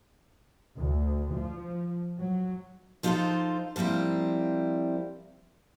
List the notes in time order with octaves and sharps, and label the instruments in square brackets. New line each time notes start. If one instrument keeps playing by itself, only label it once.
[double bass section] D2
F3
F#3
[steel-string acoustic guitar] F3 D#4 F4 G4 A4 C5
F3 G3 A#3 C4 E4